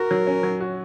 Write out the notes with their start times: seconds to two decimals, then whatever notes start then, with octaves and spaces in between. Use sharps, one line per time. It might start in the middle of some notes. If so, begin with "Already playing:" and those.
Already playing: F#4 A#4
0.11 F#3
0.27 C#4
0.43 F#3
0.60 F#4